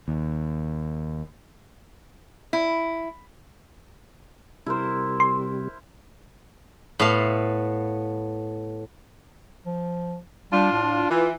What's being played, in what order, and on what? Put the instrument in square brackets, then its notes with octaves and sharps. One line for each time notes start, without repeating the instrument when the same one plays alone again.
[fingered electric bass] D#2
[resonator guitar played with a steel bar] E4
[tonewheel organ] C3 G3 [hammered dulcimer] E4 A#4 C5
[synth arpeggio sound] C6
[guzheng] A2 B3 A4 F5 C6
[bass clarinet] F3
[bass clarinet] G3 [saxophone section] D4 F4
[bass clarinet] A2
[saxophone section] E3 [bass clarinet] F4